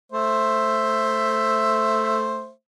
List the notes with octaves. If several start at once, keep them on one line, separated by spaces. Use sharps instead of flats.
A3 C5 E5